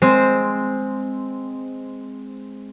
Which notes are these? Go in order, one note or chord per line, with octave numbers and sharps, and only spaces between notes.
G#3 C4 C5